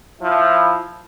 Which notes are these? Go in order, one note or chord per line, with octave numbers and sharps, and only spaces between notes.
F3 E4